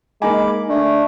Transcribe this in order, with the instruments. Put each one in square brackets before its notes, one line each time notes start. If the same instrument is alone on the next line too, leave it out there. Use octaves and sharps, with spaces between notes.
[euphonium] G#3 [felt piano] A#3 D#4 G#5 [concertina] B5 D6
[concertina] A3 [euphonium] D4